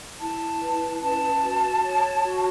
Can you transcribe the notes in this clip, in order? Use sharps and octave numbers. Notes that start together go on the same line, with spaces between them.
E4 A5
B4
C#4 A5
F#4
C#5
F#4